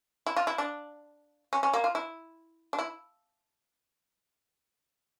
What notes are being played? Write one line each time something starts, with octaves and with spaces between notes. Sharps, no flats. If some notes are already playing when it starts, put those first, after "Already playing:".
E4
F4
E4
D4
C#4
C#4
A#3
F4
E4
D4
E4